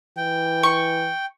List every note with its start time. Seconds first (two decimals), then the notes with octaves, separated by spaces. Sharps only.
0.17 E3 G5
0.63 C#6